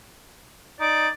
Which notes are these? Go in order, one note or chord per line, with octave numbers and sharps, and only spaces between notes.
D#4 D5